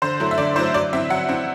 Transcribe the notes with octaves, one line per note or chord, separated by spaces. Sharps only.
D3 C5
F#3 A3 E4
E5
D3 D5
F#3 A3 E4 C5
F#3 D5
C4 E4 E5
F#3 F#5
C4 E4